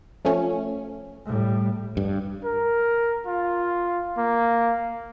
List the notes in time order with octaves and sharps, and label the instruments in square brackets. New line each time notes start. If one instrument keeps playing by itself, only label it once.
[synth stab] F3 A3 C#4
[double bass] A2 G3
[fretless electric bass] G2
[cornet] A#4
F4
A#3